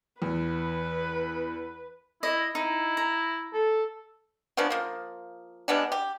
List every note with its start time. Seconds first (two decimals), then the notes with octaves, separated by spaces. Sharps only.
0.22 E2 B4
2.23 E4 D#5
2.55 D#4 E4
2.97 A#5
3.53 A4
4.57 C#3 F3 B3 D4
4.70 F3 A#3
5.68 G3 G#3 B3 D4
5.92 G4